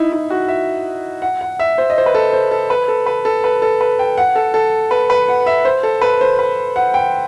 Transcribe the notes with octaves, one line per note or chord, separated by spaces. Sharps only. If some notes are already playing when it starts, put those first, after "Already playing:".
Already playing: D#4 E4
E4
F#4
E5
F#5
F#5
E5
C5
D#5
C5
B4
A4
C5
A4
B4
A4
B4
A4
B4
A4
B4
G5
F#5
A4
A4
B4
B4
F#5
E5
C5
A4
B4
C5
B4
F#5
G5